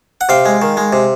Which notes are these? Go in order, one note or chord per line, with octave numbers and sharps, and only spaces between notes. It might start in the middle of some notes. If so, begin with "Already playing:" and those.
F#5
C3 F5 G5
G#3
D#3
G#3
C3